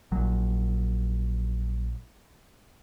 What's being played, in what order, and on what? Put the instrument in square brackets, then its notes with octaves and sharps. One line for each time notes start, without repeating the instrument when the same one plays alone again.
[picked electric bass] A#1 F#3